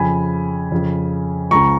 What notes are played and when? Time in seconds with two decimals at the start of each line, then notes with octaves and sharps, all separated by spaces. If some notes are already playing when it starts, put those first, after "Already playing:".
Already playing: F2 C#3 G#5 B5
0.72 F2 C#3
1.51 C#2 C#3 A#5 C#6